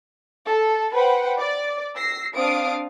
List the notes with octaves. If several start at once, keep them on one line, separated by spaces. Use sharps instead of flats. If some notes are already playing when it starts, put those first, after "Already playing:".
A4
B4 C5 F#5 G5 B5
D5
E6 A#6 C7
C4 D4 F5 D#6 D7